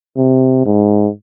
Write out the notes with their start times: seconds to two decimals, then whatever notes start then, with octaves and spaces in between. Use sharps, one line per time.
0.17 C3
0.65 G#2